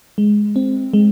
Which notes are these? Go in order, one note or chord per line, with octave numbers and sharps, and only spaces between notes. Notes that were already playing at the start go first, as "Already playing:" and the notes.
G#3
C4
G#3